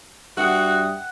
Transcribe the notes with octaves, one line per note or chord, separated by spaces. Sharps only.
G2 F#4 E5 F#5 G5 D#6